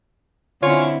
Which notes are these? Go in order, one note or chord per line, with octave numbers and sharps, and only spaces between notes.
D3 C4 C#4 E4 F4 C#5